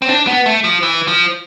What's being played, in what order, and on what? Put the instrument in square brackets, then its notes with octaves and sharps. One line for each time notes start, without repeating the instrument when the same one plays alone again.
[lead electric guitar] C4
D4
B3
A3
F3
E3
F3